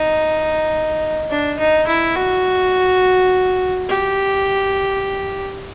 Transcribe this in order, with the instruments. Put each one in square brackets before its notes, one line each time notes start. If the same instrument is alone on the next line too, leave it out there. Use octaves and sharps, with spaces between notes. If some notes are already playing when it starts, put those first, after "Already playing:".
Already playing: [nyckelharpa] D#4
D4
D#4
E4
F#4
G4